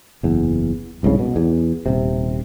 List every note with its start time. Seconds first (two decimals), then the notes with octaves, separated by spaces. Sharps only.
0.23 F#1 E2
1.03 F1 C2 G#2 C#3
1.19 B2
1.36 E2
1.86 D#1 C3